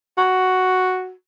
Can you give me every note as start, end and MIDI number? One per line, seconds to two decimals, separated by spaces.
0.18 1.12 66